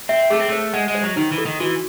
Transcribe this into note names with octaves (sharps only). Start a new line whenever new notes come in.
C4 E5
A3 G#4
C4
A3 C5
G#3 F#5
G#3
C5
F#3
D#3 D#4
E3
A4
D#3
E3 F#4